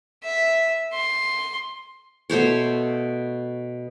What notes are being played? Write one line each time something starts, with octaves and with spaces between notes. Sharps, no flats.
E5
C6
B2 A3 C5 C#5